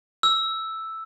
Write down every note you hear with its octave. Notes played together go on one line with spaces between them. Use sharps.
E6